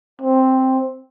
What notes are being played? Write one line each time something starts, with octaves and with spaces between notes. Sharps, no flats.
C4